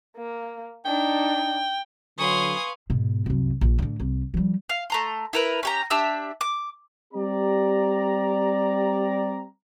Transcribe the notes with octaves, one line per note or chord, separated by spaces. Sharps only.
A#3
D4 D#4 G5
D3 F#3 B4 F5 G#5 C6 C#6 D#6
G#2 B2
C2 F#2
A#1
A2 D3
C2
F3 G3
F5
A3 A#5 C6
E4 A#4 B4
C#4 G4 A#5
D4 G4 E5 E6
D6
G3 C4 G4 D5 A#5